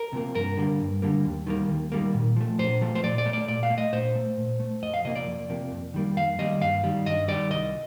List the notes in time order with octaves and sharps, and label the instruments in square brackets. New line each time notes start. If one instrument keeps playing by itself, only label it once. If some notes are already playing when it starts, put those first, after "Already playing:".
Already playing: [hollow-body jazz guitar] A#4
C3 F3 A#3
G2 A#4
D3 G3 A#3
G2
D3 G3 A#3
D#2
D#3 G3 A#3
D#2
D#3 G3 A#3
A#2
F3 A3
A#2 C5
F3 A3
C5
A#2 D5
D5
A3
D5
A#2 D5
F5
A3
D#5
A#2 C5
A3
A#2
A3
F2 D#5
F5
C3 F3 A#3 D#5
D5
F2
C3 F3 A#3
F2
D#3 G3 A#3
F2 F5
D#3 G3 A#3 D#5
G2 F5
D#3 G3
G2 D#5
D#3 G3 D5
C2 D#5